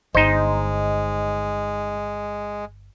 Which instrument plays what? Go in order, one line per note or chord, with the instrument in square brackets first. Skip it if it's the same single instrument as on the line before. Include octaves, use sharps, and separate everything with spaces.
[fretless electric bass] G1 [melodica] G#3 [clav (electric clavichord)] D#4 C5 [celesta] D#5